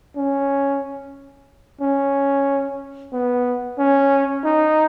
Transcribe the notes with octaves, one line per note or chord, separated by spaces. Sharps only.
C#4
C#4
B3
C#4
D#4